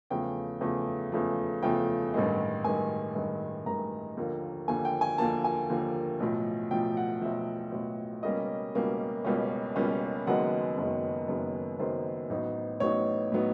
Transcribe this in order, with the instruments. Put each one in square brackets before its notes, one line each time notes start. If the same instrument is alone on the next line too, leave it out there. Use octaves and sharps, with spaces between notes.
[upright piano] E2 C#3 F3 A3 G5
E2 C#3 F3 A3
E2 C#3 F3 A3
E2 C#3 F3 A3 G5
A1 G2 D#3 G#3
A1 G2 D#3 G#3 G#5
A1 G2 D#3 G#3
A1 G2 D#3 G#3 A#5
D#2 D3 F3 A#3
D#2 D3 F3 A#3 G#5
G5
G#5
D#2 D3 F3 A#3 A5
G#5
D#2 D3 F3 A#3
B1 A2 F3
B1 A2 F3 G5
F#5
B1 A2 F3 E5
B1 A2 F3
C#2 B2 G3 A#3 C#4 D#5
C#2 B2 G3 A#3 C#4
C#2 B2 G3 A#3 C#4
C#2 B2 G3 A#3 C#4
F#1 F#2 D#3 G#3 B3 F#5
F#1 F#2 D#3 G#3 B3
F#1 F#2 D#3 G#3 B3
F#1 F#2 D#3 G#3 B3 C5
A1 A2 F#3 B3 D#4
A1 A2 F#3 B3 D#4 C#5
A2 F#3 B3 D#4